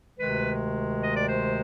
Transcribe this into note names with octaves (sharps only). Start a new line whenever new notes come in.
D2 C3 D#3 G#3 B4
D#5
D5
C5